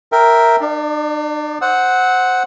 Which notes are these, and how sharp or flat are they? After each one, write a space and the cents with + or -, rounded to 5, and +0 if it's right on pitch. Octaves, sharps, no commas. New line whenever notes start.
A#4 +0 E5 +0 G5 +0
D4 +45 D5 +0
C5 +0 F#5 +0 E6 -35